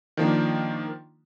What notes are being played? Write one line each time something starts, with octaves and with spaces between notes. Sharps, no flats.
D#3 F3 A#3 D4